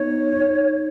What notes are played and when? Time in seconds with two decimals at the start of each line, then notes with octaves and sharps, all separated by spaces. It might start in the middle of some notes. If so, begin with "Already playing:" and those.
Already playing: B3 D#4 C#5
0.33 D#4